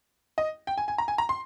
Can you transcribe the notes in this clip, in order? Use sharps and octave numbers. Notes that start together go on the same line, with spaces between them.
D#5
G5
G#5
G#5
A#5
G#5
A#5
C6